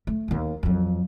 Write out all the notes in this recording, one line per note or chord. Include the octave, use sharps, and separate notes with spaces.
A3
D#2 B3
F2 F#3